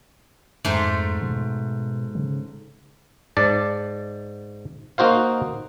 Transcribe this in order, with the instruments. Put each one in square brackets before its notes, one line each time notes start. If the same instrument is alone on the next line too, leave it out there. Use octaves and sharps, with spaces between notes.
[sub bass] F2 [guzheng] G#2 A3 C6
[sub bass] B2
C#3
[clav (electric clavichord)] G#2 D5 A5
A#3 D#4 F#4 C5 F5